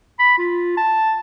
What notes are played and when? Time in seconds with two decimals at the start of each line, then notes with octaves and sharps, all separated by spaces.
0.19 B5
0.38 F4
0.78 A5